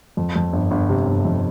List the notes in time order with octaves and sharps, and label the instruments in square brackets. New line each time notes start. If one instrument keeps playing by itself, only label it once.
[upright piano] F2
F2
G1
G1
C3
G1
F2